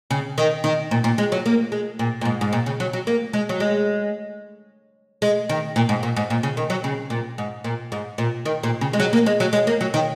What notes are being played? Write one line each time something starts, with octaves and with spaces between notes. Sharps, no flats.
C#3
D#3
D#3
A#2
A#2
G#3
F#3
A#3
G#3
A#2
A#2
G#2
G#2
A#2
C#3
F#3
F#3
A#3
G#3
F#3
G#3
G#3
D#3
A#2
G#2
A#2
G#2
A#2
C#3
D#3
F#3
C#3
A#2
G#2
A#2
G#2
A#2
D#3
A#2
C#3
G#3
F#3
A#3
G#3
F#3
G#3
A#3
F#3
D#3